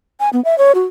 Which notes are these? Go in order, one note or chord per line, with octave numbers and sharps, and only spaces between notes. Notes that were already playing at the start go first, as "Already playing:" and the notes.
G#5
B3
E5
C#5
F#4